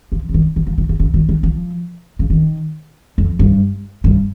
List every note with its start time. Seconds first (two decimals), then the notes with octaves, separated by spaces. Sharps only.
0.12 F3
0.29 C#3
0.34 D#3
0.56 D#3
0.67 F3
0.78 D#3
0.89 C#3
0.99 C#3
1.14 D#3
1.29 D#3
1.43 F3
2.19 C#3
2.30 D#3
3.18 F2
3.39 G2
4.04 G2